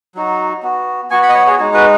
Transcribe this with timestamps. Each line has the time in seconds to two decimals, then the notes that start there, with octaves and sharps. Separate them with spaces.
0.15 F#3 D#4 F#4
0.63 B3 F#4
1.10 B3 F#4 G#5 C#6
1.23 F#5 B5
1.29 D#5
1.35 C#5 F#5
1.47 G#4 C#5
1.58 G#3 D#4 F#4
1.74 F#4 B4